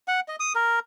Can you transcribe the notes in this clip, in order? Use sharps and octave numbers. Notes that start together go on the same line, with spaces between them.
F#5
D#5
D#6
A#4